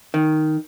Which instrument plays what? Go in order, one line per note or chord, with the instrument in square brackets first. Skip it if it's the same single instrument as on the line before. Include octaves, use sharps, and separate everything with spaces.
[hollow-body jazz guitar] D#3